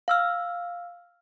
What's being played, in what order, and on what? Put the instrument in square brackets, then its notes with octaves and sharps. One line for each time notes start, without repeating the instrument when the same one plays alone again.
[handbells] F5 E6 F6